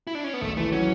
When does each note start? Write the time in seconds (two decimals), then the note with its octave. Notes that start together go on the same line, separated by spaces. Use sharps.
0.07 E4
0.15 D4
0.24 C#4
0.33 B3
0.41 G#1 A3
0.57 E3 A3
0.72 F#3 C#4